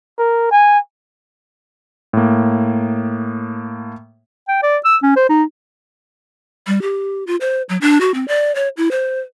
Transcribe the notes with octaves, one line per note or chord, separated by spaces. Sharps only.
A#4
G#5
A2 A#3
G5
D5
E6
C#4
C5
D#4
G3
G4
F4
C5
F#3
D4
F#4
C4
D5
C#5
E4
C5